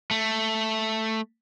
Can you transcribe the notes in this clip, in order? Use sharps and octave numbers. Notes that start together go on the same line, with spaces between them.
A3